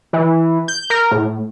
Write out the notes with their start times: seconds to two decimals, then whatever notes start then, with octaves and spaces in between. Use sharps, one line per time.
0.13 E3
0.68 G6
0.90 A#4
1.12 A2